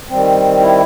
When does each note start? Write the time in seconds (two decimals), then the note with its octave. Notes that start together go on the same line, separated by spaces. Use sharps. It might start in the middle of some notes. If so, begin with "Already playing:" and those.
0.09 D#3 G3 C4
0.60 E4